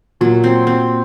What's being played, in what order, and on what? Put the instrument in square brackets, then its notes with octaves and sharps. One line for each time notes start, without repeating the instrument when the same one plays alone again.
[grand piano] A#2 [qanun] F#3
[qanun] C4
C4